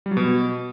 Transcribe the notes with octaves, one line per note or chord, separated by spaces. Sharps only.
G3
F#3
B2